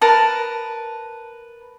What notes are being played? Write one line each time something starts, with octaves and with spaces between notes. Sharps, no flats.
A#4 B4 A5